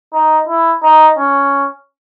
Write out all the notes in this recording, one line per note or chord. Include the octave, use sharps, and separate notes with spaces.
D#4
E4
D#4
C#4